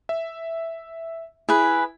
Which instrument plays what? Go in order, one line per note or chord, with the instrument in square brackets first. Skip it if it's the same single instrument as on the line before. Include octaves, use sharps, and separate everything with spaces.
[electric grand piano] E5
[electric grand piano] E4 [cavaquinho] G#4 B4